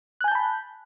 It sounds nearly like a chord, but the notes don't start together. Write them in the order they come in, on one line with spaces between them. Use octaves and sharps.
F#6 G#5 G6 A5 B5